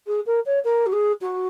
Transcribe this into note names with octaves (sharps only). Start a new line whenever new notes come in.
G#4
A#4
C#5
A#4
F#4
G#4
F#4